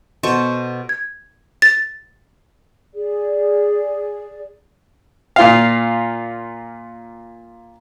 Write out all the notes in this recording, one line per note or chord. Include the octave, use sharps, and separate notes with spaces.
B2 A4 C5 C#6
G#6
A6
G#4 D5
A#2 F4 F5